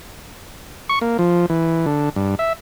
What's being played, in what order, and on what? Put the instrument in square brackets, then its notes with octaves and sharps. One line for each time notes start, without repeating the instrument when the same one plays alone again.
[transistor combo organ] C#6
A#3
F3
E3
D3
G2
E5